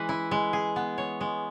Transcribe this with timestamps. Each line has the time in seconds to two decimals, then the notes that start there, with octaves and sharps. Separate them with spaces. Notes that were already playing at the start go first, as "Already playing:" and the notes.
Already playing: E3 G#3 B4
0.09 E4
0.31 G#3
0.53 G#4
0.76 B3
0.98 C#5
1.21 G#3